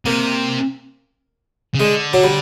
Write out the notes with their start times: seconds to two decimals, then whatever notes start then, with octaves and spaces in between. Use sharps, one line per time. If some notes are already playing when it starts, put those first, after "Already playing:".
0.05 C3 A#3
1.74 C#3
1.79 D3 G#3
2.13 F#3
2.24 G3